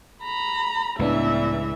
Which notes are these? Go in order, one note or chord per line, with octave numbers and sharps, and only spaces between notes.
A#5 B5
C#2 A2 E3 B3 D4 E5